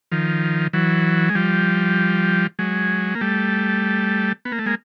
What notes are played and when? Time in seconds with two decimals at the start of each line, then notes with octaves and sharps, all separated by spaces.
0.12 D#3 F3
0.73 E3 F#3
1.29 G#3
1.35 F3 G3
2.59 F#3 G#3
3.15 A#3
3.21 G3 A3
4.45 B3
4.52 A#3
4.59 A3
4.66 G#3 A#3